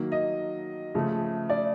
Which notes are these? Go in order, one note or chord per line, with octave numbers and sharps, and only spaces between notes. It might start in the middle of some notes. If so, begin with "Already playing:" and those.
Already playing: D#3 F#3 A#3
D#5
C#3 F3 A3
D5